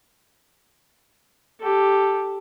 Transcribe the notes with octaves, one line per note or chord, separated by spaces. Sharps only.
G4 A4